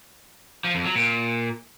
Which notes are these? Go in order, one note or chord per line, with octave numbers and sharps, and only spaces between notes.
F3
F2
F#3
A#2